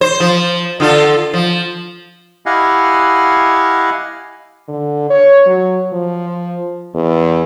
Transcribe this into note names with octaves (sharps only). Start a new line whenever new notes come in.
C5
F3
D3 F4 A4
F3
E4 G4 D#5 F5 F#5 G#5
D3
C#5
F#3
F3
E2